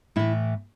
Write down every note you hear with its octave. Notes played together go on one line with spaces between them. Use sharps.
A2 E3 E4